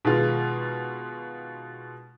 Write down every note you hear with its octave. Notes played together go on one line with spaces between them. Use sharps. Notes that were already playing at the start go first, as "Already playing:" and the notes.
B2 D#3 G#3 F4